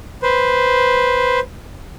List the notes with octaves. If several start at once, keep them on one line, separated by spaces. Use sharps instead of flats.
B4 C5